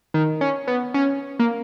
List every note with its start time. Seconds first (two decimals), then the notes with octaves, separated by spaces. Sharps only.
0.14 D#3
0.41 C#4
0.67 B3
0.94 C#4
1.39 A#3